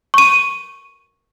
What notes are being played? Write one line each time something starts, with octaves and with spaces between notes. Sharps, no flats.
C#6 D#7